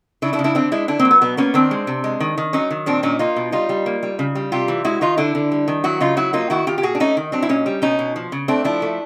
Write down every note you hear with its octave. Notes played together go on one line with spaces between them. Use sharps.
C#3 D4 E4
D4 E4
C#3
D4 E4
D3 C4 D4
G#3 D4 E4
D3 D4 E4
A#3 C4
F#3
B3
B2 B3
A#3 B3 C#4
D#3 C4 D4
G#3
C3
G#3
D#3
D#3
F#3 C#4 D#4
D#3
A#2 C4 D4
A#2 C#4 D#4
A#3 D#4 F4
B2
G3 D#4 F4
G3
A#3
G3
C#3
G3
C3 F4 G4
E3
G#3 E4 F#4
D#3 D#4 F4
D3 D4 E4
D3
G3
D#3
F#3 E4 F#4
C#3 D#4 F4
F#3 E4 F#4
A#3 D#4 F4
D#3 E4 F#4
D#3 F4 G4
G4
A#2 F#4 G#4
D4
A3 C#4 D#4
D#3
F#3 C4 D4
E4
A#2 C#4 D#4
G3
B2 C#4 D#4
B2
F3
C#3
A3 C4 D4
F3 D4 E4
A3